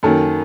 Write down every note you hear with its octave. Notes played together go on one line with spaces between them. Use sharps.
F#2 D#3 A#3 A4